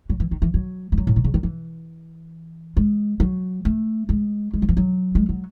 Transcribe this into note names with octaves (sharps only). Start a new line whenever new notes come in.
F#3
E3
D#3
E3
F#3
G#3
F#3
A2
B2
C#3
D#3
E3
G#3
F#3
A3
G#3
G#3
F#3
E3
F#3
G#3
F#3